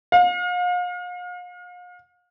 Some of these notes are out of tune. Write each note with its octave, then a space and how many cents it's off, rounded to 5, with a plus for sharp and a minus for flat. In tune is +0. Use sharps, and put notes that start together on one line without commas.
F5 +40